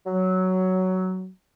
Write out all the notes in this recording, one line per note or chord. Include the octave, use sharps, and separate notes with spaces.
F#3